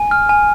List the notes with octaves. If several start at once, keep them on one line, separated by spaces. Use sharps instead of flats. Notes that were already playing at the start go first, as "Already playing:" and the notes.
Already playing: G#5
F6
G#5